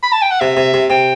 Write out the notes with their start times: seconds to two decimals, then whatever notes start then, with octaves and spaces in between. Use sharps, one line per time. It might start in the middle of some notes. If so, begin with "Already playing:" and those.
0.03 B5
0.12 A5
0.22 G5
0.31 F#5
0.41 C3 E5
0.57 C3
0.74 C3
0.90 C3 G5